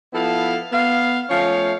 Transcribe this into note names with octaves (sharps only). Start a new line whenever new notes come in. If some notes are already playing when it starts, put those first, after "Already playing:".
F3 B3 E4 A4 F5
B3 F5
F3 A3 C#4 F5